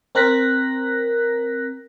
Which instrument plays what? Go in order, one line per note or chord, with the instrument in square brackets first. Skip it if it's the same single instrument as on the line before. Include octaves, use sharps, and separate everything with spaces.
[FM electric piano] C4 A#4 F#6 A#6 B6